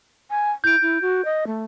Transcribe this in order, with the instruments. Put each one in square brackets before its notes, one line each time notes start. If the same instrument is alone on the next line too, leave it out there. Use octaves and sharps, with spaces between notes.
[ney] G#5
[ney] E4 [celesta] G6 D7
[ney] E4
F#4
D#5
A3